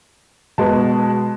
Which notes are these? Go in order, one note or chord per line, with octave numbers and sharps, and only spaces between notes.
B2 G#3 B3 A5